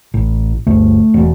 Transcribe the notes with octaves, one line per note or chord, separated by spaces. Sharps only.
A1
G1 D2 A3
E1